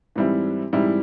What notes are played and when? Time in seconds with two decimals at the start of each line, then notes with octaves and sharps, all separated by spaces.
0.15 G#2 E3 G3 C4 E4
0.72 G#2 E3 G3 C4 E4